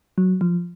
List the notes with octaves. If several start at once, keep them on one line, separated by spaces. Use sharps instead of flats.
F#3
F3